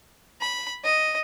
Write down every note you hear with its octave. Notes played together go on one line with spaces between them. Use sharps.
B5
D#5